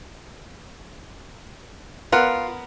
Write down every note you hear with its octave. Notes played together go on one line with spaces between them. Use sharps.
B3 F4 A#4 F#5